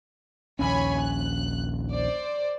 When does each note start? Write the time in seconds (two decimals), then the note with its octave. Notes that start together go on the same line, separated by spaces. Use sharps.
0.59 A#1 D#2 C#4 C#5 G#5 B5
1.00 F#6
1.91 C5 D5